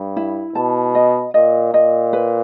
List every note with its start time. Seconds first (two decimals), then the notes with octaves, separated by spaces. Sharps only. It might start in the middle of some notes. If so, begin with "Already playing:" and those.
Already playing: G2
0.17 E4
0.55 B2 A5
0.95 D#5
1.34 A#2 D#5
1.74 A#2 D#5
2.13 B4